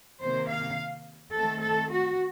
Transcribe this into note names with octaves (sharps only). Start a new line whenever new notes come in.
C3 D#3 A#3 C5
F5
D#3 A3 C4 A4
A4
F#4